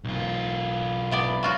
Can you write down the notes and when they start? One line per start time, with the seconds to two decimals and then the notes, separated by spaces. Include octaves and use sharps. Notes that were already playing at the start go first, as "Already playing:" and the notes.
0.04 B1 F4
1.11 C3 B3 D5
1.43 F#3 F4 F#4